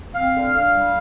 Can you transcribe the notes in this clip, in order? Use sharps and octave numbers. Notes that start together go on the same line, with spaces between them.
C4 F5
D3
D3
G3